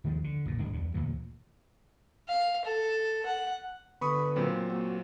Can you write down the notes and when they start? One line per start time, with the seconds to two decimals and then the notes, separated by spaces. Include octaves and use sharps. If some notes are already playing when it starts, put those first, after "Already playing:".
0.04 D#2 D#3 F3 G#3
0.24 D3
0.46 F#1 A#2
0.58 D1 G#2 G#3 D4
0.73 E2 G2
0.94 D2 G2 A#2 E3
2.29 F5
2.65 A4
3.26 F#5
4.01 D3 B3 B4 B5 C#6 D#6
4.36 A#2 F#3 C4
4.70 A#3 F#4